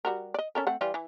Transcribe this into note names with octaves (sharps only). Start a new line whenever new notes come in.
G3 F#4 A#4
D5 D#5
C#4 A4 A#4
A3 C4 F#5
E3 G3 F4
E3